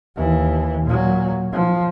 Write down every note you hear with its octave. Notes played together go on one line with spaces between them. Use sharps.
D#2 E3
A#2 F#3
F3